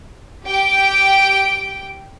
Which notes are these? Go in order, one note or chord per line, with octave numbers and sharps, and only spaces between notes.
G4 G5 D7